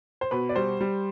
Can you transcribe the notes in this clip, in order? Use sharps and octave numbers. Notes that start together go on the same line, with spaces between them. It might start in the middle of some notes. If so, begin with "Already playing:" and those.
C5
B2 B4
D5
G3 C5
G3